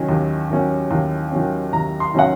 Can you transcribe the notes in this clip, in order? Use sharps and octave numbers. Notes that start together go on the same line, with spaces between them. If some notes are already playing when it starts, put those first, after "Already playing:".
Already playing: D#3 F#3 C#4
D#2
D#3 F#3 C#4
D#2
D#3 F#3 C#4
D#2 A#5
C6
D#3 F#3 C#4 F#5